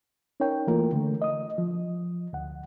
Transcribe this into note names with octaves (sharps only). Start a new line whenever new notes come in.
C#4 D#4 A#4 C#5 G5
E3 A3 A#3 F4 A#4
D3 A3
D#5 D#6
F3
D2 F#5